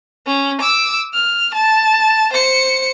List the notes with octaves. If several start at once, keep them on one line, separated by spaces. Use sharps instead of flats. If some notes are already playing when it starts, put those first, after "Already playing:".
C#4
D6 E6
F6
A5
C5 C#7